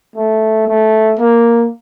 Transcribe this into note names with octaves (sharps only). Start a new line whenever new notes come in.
A3
A3
A#3